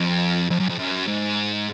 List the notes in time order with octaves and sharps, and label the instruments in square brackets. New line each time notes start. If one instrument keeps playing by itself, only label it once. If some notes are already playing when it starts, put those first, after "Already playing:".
Already playing: [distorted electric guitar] F2
F2
F#2
F2
F#2
G#2